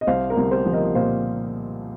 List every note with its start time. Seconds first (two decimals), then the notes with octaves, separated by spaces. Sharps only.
0.01 D#5
0.07 C2 C5 F5
0.30 A#4
0.37 C2
0.51 G4 C5
0.66 F3
0.73 A#4 D#5
0.95 A#2 C5 F5